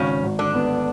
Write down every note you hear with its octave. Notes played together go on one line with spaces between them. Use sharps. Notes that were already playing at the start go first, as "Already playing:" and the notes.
Already playing: G#1 C#3 C#4
G#1
D3 D4
B3